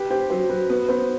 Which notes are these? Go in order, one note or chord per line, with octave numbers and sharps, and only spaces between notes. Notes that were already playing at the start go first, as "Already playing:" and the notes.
Already playing: G4 B4
G4 C5
F#3 C5
F#3 B4
B3 B4
B3 C5